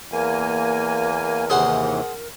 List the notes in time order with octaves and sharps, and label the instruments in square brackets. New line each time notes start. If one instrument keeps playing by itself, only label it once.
[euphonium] E2 [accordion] A#3 G#5 [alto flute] A#4
[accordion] D#2 C3 E3 [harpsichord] G#4 C5 F#5